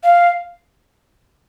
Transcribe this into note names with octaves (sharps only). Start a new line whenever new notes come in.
F5